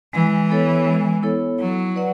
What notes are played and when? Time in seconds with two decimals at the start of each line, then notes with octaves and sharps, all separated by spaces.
0.13 E3 G#3
0.50 B3 E4 A4 C#5
0.86 G#3
1.23 B3 E4 A4 C#5
1.59 F#3 E4
1.96 B4 D5 F#5